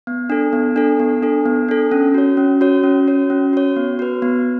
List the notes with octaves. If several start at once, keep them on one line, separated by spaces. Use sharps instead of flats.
B3
D4 A4
B3
D4 A4
B3
D4 A4
B3
D4 A4
C#4
F#4 C#5
C#4
F#4 C#5
C#4
F#4 C#5
C#4
F#4 C#5
B3
F#4 B4
B3